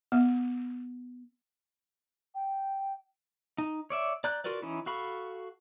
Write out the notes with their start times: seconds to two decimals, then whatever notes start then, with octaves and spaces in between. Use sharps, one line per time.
0.12 B3
2.35 G5
3.58 D#4
3.90 C#5 D5 E5
4.24 D5 A#5 F#6 G6
4.44 F4 F#4 A#4 B4 D5
4.62 E3 C#4 D#4 E4
4.86 F#4 A4 F5 B5 C#6